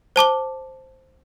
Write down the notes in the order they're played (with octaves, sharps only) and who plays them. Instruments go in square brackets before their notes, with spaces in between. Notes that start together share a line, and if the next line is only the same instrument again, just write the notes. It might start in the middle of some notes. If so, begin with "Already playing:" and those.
[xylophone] C5 A5 D6 G7